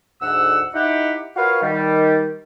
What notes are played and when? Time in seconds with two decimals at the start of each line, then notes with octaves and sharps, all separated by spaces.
0.21 D2 G#2 F#5 E6
0.74 D#4 E4 G4 F#5
1.36 F4 F#4 A#4 B4 C#5 F5
1.62 D#3 G3